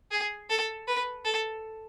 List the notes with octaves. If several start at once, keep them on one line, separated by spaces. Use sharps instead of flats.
G#4
A4
B4
A4